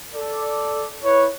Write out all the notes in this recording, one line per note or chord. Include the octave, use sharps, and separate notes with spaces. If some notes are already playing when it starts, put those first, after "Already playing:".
A4 D5
E4 B4 C#5